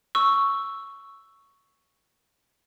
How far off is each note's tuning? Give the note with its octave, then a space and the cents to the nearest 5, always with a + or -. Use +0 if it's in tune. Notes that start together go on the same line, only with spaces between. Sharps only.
C#6 +0 E6 +0